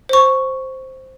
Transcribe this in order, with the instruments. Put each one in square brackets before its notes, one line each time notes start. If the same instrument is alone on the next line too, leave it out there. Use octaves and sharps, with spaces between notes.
[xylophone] C5 C#6